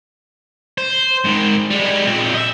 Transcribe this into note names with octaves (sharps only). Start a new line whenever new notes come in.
C5
G#2 D#3
G3 G#3
A#2 C4
D#5 E5